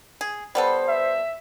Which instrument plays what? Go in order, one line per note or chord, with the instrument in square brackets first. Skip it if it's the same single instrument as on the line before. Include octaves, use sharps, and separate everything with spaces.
[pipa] G#4
[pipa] G3 B3 A4 [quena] C5
[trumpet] E5